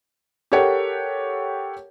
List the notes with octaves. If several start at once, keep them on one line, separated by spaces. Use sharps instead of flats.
G4 A4 A#4 C#5 F#5 G5